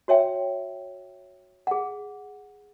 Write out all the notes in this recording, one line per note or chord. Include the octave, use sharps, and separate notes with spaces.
F#4 C#5 E5 G5
G#4 F#5